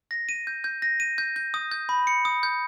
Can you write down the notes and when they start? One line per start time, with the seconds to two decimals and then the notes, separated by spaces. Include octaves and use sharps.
0.11 A#6
0.29 D#7
0.47 G6
0.64 G6
0.82 A#6
1.00 D#7
1.18 G6
1.36 G6
1.54 D#6
1.71 G6
1.89 B5
2.07 C#7
2.25 D#6
2.43 G6